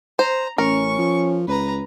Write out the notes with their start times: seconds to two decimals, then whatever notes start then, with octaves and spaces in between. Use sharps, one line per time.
0.19 C5 A#5
0.58 A1 C#4 A#4 C#6
0.98 F3
1.48 C#2 B4 A#5